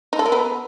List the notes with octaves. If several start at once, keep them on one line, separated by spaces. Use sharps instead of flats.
D#4
A4
A#4
B3